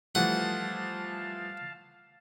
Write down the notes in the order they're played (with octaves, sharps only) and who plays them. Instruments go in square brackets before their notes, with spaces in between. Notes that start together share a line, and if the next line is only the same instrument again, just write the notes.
[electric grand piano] E3 F3 A3 [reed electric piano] G3 [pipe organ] F5 A5 [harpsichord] F#5